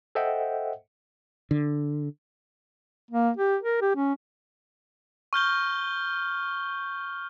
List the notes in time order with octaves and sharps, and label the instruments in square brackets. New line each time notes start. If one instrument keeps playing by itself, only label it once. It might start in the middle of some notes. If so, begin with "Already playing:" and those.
[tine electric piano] A4 C5 D#5 E5 F#5 G5
[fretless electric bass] D3
[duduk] A#3
G4
A#4
G4
C#4
[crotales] C#6 F6 G6 G7